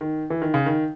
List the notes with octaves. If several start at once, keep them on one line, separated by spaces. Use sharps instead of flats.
D#3
E3
D#3
C#3
D#3